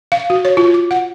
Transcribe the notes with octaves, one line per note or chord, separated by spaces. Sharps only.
F5
F#4
C#5
F4
D6
F#5